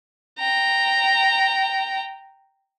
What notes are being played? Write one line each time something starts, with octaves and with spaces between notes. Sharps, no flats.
G5 A#5